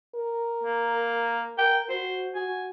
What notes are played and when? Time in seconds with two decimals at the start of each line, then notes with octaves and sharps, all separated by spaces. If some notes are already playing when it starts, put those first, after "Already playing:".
0.15 A#4
0.64 A#3
1.58 A#4 G5
1.89 F#4 C5
2.36 F#4 G#5